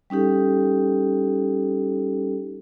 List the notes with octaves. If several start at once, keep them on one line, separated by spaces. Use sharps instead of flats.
G3 C#4 D#4 G4 A4